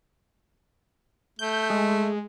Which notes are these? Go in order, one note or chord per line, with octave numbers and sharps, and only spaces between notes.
A3 G6
G#3